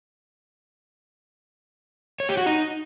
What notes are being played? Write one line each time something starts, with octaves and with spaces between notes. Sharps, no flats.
C#5
G4
F#4
D#4